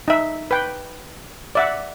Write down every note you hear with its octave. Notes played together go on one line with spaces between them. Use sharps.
D#4 E5
B4 G5
D5 E5 F#5